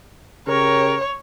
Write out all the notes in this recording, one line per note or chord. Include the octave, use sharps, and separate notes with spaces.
C#3 G4 A#4 C#5